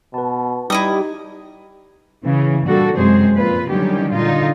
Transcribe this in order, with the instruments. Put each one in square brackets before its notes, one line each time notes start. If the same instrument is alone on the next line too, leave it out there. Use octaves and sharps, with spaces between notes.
[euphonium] B2 [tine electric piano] B4 A5
[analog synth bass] G3 [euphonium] D#4 [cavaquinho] E4 D#5 D#6
[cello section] C#3 E3
A#2 G3 D4 F#4 A4
F#2 C3 G#3 G#4 C5
F2 A#2 F4 B4
D3 D#3 F#3 G3 C#4 G4
A#2 D3 D#4 F4